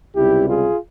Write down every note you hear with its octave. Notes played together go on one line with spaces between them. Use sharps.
C#2 C3 G3 E4 G4
F4 G#4